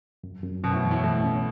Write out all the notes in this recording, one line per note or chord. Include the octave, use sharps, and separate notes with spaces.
F#2
F#2
F#2 B2
A2
E3
A2
B2 A3
C#4